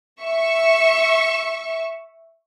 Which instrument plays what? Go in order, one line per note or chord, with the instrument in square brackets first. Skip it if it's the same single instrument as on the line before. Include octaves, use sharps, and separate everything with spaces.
[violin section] E5 C#6